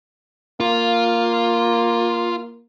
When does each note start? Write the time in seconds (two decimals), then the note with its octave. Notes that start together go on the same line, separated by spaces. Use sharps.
0.60 A#3 F4